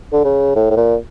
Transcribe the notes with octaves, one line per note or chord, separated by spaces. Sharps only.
D3
C#3
A2
A2
A#2